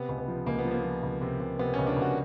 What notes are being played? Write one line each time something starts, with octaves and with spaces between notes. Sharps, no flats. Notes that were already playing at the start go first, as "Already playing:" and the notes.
Already playing: C3 B3
C#2
B3
F3
C#2 A#3
B3
F3
A#3
F3
C#2
C3
C3
C3 B3
C#2 C#4
D4
C#2
F#4